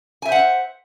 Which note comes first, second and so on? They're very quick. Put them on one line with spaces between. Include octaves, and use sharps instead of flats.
G#5 E5 C5 F#5